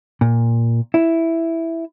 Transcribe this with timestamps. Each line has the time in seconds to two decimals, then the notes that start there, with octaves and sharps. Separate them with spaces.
0.21 A#2
0.94 E4